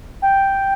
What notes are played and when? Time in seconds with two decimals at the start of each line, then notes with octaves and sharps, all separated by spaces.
0.22 G5